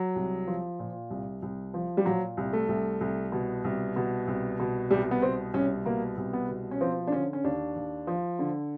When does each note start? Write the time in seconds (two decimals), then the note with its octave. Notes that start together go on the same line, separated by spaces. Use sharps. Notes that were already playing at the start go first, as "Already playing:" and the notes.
Already playing: F#3
0.16 C2
0.47 F3
0.79 A#2
1.10 C2
1.42 C2
1.74 F3
1.97 G3
2.05 A#2 F#3
2.37 C2
2.53 A3
2.69 C2
3.01 C2
3.32 B2
3.64 C2
3.96 B2
4.28 C2
4.60 B2
4.90 C2 G3
5.11 B3
5.22 B2 C4
5.54 C2 C#4
5.85 B2 A#3
6.17 C2
6.33 B3
6.49 B2
6.71 C#4
6.81 F3 C4
7.07 D4
7.12 D3 C#4
7.33 C#4
7.44 D#2 D4
7.76 D#2
8.07 F3
8.39 D3